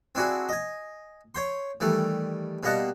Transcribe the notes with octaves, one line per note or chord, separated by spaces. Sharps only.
C4 D4 E4 F#4 G#4
D#5 G#5
C#5 G5 C6
D#3 E3 G3 A3
B2 G3 A#3 D#5 F#5 A5